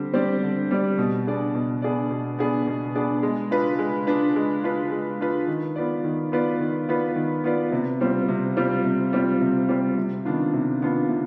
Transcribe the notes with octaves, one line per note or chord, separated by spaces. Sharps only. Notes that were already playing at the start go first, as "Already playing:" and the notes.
Already playing: D3 G3 C4 G4
G3 C4 G4 D5
D3
G3 C4 G4 D5
B2
B3 D4 G#4 D5
B2
B3 D4 G#4 D5
B2
B3 D4 G#4 D5
B2
B3 D4 G#4 D5
G#3
D4 F4 B4
G#3
D4 F4 B4
G#3
D4 F4 B4
G#3
D4 F4 B4
D#3
B3 F4 B4 D5
D#3
B3 F4 B4 D5
D#3
B3 F4 B4 D5
D#3
B3 F4 B4 D5
C3
G3 C4 F4
C3
G3 C4 F4
C3
G3 C4 F4
C3
G3 C4 F4
C3
D#3 B3 D4 F4
C3
D#3 B3 D4 F4
C3